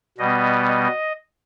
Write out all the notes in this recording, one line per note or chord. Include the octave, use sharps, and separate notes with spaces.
B2 G3 B3 D#5
D#5